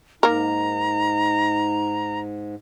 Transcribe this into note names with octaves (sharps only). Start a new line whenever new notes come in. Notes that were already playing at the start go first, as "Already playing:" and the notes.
G#2 A#3 D#4 A#4 A#5